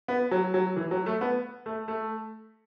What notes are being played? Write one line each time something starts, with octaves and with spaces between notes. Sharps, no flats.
B3
F#3
F#3
E3
F#3
A3
B3
A3
A3